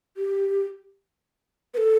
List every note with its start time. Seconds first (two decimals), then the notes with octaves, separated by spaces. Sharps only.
0.17 G4
1.74 B4
1.77 A4